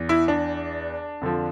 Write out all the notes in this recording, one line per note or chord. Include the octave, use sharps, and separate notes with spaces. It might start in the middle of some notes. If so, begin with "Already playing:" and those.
Already playing: E2 E3
E4
D4
F2 D3 F3